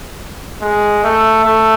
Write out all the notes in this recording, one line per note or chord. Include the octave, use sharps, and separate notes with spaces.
G#3
A3
A3